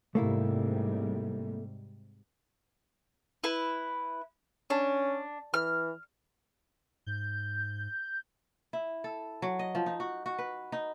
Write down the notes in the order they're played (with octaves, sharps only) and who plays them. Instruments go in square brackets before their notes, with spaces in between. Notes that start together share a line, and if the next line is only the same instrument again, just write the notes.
[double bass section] G#2 C3 G3 [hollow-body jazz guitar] A3 A#3 E4
[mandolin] E4 B4
[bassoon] C#4 [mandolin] D4
[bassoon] E3 [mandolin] F6
[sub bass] G#2 [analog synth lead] G6
[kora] E4
A4
F#3
D#5
F3
D#4
F#4
F#4
B4
D#4